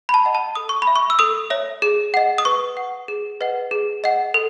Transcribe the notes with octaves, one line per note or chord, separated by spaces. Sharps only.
B5
A5
D#5 F#5
A5
A4 D#6
C#6
B5
E5
C#6
E6
A4 D#6
C#5 E5
G#4
D#5 F#5
D#6
B4 C#6
F#5
G#4
B4 D#5 F#5
G#4
D#5 F#5
A4